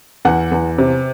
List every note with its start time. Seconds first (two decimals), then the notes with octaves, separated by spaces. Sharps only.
0.25 E2 F#5
0.52 E2
0.78 C3